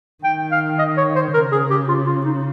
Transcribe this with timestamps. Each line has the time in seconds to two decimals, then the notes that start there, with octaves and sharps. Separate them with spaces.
0.24 D#3 G5
0.52 F5
0.79 D#5
0.97 C#5
1.16 C5
1.34 C#3 A#4
1.52 G#4
1.70 G4
1.89 F4
2.07 F4
2.25 D#4